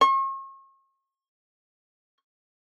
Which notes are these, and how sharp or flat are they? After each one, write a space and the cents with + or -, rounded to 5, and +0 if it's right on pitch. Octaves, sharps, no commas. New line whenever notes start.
C#6 -40